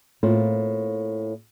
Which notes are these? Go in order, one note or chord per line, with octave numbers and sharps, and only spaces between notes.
A2 A#3 C4 F4